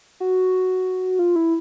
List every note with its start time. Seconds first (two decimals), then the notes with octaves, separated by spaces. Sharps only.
0.20 F#4
1.19 F4
1.36 E4